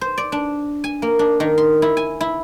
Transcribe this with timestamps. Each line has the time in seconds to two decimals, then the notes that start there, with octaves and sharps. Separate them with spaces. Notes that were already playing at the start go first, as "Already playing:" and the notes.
0.01 C5
0.18 D5
0.32 D4
0.84 G#5
1.02 A#3
1.19 D4
1.40 D#3
1.58 C6
1.82 E4
1.97 G#5
2.21 E4